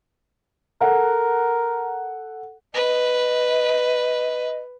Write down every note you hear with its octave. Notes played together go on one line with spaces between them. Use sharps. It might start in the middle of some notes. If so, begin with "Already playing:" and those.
A4 A#4 F#5
B4 D#5